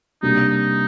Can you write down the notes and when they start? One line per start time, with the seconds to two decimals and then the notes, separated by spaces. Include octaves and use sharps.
0.22 C3 G3 A#3 D4 D#4
0.49 D#4